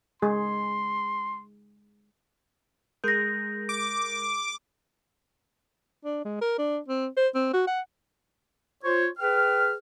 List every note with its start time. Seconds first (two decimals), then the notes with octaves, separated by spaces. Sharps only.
0.22 G#3 G#4 C6
3.04 G#3 G#4 A#4 G6 A#6
3.69 D6
6.04 D4
6.25 G#3
6.41 A#4
6.58 D4
6.88 C4
7.17 C5
7.35 C4
7.53 F#4
7.67 F#5
8.84 F4 C5 C#5
9.19 G#4 B4 G5 F6